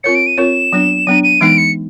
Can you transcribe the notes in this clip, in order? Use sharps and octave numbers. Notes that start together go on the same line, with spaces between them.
C4 F4 A#4 C#5 C#7
D7
D#7
C4 F4 A#4 C#5 E7
F#3 B3 D4
F#3 B3 D4 D#7
D#7
E3 G#3 B3 D#4 D7
C#7